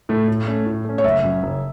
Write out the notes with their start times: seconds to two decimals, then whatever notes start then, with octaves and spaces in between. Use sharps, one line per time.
0.09 A2 A3
0.28 A2
0.48 A3 C#4
0.66 A2
0.85 A3 C#4
0.98 C#5
1.04 F#1 E5
1.23 F#2 F#3 C#4
1.43 F#1